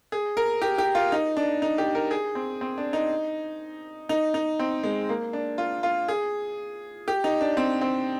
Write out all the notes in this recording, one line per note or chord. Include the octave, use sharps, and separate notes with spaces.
G#4
A#4
G4
G4
F4
D#4
D4
D#4
G4
A#4
G#4
C4
C4
D4
D#4
D#4
D#4
C4
G#3
A#3
D4
F4
F4
G#4
G4
D#4
D4
C4
C4